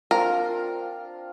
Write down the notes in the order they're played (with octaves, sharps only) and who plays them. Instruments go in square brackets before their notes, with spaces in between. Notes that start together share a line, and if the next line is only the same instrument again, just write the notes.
[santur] C4 D4 F4 [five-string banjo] A#4